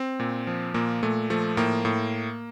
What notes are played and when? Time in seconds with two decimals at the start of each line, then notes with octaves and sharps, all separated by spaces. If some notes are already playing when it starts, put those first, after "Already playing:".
Already playing: C4
0.20 A#2
0.47 F3
0.74 A#2 A#3
1.03 A#2 A3
1.30 F3 A3
1.57 A2 A#3
1.85 A2